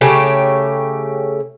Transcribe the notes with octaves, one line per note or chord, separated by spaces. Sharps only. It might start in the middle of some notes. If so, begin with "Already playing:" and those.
C#3 A3 G4 C#5